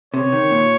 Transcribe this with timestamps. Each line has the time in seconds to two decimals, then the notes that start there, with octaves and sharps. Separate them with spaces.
0.14 C3 C#5
0.32 D#3
0.51 A#2